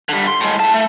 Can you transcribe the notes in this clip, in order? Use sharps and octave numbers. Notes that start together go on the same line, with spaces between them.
D3 G3
C6
A2 G#3
E4 A5
A3